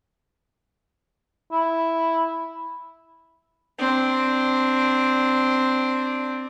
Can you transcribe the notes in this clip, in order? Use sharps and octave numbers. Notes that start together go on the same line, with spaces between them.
E4
C4 D4